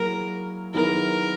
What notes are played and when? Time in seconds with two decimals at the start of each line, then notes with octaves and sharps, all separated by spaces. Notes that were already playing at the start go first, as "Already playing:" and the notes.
Already playing: F#3 A#3 E4 G#4 A#4
0.74 D#3 F#3 B3 E4 G#4 A#4